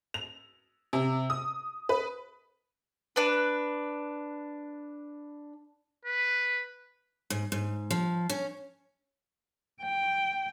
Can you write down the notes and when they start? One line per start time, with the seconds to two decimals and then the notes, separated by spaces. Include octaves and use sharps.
0.14 F7
0.93 C3
1.30 D#6
1.89 B4
3.16 D4 B4
6.05 B4
7.30 G#2
7.52 G#2
7.91 F3
8.30 C#4
9.82 G5